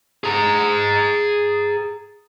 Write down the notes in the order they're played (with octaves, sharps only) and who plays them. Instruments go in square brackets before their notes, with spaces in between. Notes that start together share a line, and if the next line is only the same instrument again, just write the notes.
[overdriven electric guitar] G#4 A#5